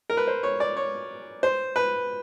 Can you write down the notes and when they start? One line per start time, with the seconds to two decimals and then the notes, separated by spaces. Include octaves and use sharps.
0.10 A#4
0.17 B4
0.27 C5
0.43 C#5
0.60 D5
0.76 C#5
1.43 C5
1.76 B4